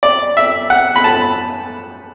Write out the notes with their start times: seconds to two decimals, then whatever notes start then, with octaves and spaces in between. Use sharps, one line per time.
0.03 D5
0.37 E5
0.70 F#5
0.96 B5
1.04 A5